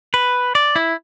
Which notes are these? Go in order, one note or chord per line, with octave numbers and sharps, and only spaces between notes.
B4
D5
E4